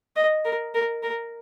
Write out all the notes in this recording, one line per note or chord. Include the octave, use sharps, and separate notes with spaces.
D#5
A#4
A#4
A#4